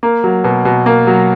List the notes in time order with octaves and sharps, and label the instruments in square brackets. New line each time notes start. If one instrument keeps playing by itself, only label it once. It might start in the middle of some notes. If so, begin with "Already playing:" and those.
[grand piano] A#3
F#3
B2
B2
A#3
F#3